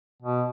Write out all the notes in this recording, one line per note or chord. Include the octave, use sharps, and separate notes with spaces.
B2